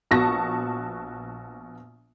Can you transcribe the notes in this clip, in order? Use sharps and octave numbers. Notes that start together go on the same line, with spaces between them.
A#1 B3 F#4 A5 C#6 A#6